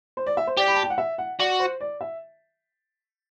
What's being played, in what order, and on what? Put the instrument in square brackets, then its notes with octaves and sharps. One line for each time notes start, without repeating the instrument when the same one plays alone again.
[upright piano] C5
D5
E5
C5
[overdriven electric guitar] G4 [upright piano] D5
[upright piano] B5
A5
G5
F#5
E5
F#5
[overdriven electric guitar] F#4 [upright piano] D5
[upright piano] C5
D5
E5